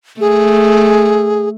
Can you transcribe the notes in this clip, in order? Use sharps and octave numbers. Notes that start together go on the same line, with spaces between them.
A3 G#4